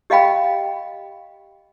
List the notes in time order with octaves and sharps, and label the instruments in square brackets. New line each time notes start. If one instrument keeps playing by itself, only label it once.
[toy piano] G4 D#5 F5 G5 B5